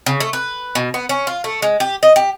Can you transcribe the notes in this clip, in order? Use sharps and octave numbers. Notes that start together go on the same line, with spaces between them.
C#3
A3
B4
B2
B3
C#4
F4
A3
G#3
G4
D#5
G4